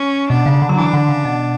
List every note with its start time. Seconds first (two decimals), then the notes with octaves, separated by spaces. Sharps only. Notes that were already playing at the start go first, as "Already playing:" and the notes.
Already playing: C#4
0.30 B2 D4
0.46 C#3
0.62 D3
0.69 F#3
0.77 E3 D4
0.93 D3
1.09 C#3
1.25 B2